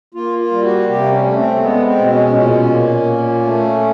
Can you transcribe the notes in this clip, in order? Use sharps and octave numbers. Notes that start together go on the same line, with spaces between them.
A#3 F4
F4
G3
F#4
C3 G4
C#4
A3
C4
G#3 B3
C4
B2
C#4
A#2 C#4
A#3
A#2
A3